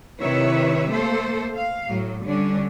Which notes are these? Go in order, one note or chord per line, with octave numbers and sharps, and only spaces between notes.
C3 D#3 E4 B4 C#5 E5
A3 A#3 A4 C5
F5
A2 F#3
D3 G3 C#4 D4